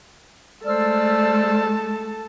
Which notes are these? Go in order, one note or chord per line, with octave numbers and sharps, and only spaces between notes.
G#3 A3 A4 C5 D5 A5 E6 F6